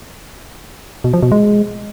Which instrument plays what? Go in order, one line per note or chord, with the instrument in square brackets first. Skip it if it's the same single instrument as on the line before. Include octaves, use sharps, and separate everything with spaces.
[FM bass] B2
F3
B2
G#3